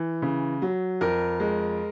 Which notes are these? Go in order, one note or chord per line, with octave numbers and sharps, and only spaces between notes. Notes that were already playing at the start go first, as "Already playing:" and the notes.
Already playing: E3
C#3
F#3
F2 A#4
G#3